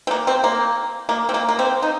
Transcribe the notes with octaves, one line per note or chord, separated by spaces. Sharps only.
C4
A#3
C4
A#3
A#3
C4
A#3
A#3
C4
D#4